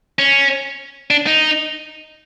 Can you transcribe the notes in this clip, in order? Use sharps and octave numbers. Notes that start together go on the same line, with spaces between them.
C#4
D4
D#4